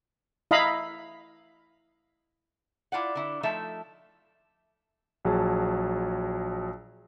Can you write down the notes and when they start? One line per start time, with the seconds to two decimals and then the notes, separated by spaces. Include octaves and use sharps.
0.51 E4 D#5 F5 A#5 B5
2.92 E4 F4 D5 F#5
3.15 D3 E4
3.43 F3 A3 D#4 A4 E5
5.25 A#1 F#3 G#4 A5